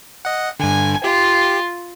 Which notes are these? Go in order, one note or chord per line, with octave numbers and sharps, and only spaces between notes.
D#5 F#5
G2 D3 G#5
F4 G4